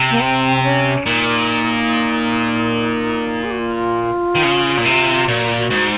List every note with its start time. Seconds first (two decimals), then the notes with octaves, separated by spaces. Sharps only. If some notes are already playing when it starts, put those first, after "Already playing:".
Already playing: C3
0.10 A#3
0.21 C4
0.63 C#4
1.06 A#2 D#4
3.44 G#4
3.51 F#4
3.59 F4
4.35 D#3
4.43 C#3
4.77 A#2
4.86 C3
5.28 A#2 F#4
5.47 F4
5.56 F#4
5.70 G#2